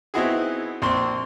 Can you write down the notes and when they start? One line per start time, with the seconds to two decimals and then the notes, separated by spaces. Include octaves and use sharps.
0.14 B3 C4 D#4 E4 F#4 G#4
0.82 A#1 C4 C6